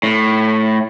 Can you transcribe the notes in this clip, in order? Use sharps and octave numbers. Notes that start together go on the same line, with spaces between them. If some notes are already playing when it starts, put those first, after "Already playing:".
A2